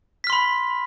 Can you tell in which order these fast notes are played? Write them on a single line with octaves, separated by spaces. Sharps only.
B6 F6 C6 B5